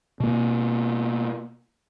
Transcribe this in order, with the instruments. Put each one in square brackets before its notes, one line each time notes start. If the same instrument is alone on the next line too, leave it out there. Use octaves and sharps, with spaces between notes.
[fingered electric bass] B2 A#3